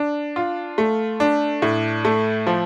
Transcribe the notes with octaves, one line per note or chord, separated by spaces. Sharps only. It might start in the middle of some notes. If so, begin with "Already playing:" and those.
Already playing: D4
F4
A3
D4
A2
A3
F3